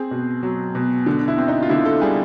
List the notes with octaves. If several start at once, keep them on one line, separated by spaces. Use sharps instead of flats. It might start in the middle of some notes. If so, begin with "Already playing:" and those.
Already playing: C4 G#4
B2
F#3
B2
D3
E4
C4
D#4
F4
D3 E4
A4
G3 G#4